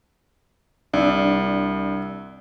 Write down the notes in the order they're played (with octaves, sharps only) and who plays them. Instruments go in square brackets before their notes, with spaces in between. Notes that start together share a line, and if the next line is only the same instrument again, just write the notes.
[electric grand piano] C2 [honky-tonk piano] D4